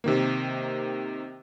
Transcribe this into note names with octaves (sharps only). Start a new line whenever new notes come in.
C3 D#3 A#3